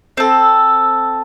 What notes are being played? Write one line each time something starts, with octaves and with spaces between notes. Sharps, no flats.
C4 A4